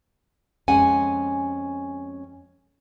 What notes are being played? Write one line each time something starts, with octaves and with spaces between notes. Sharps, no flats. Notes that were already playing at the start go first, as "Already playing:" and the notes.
F2 G#3 C#4 F#5 G#5